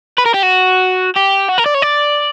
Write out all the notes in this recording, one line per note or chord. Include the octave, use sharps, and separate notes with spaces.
B4
A#4
G4
F#4
G4
F#4
A#4
D5
C#5
D5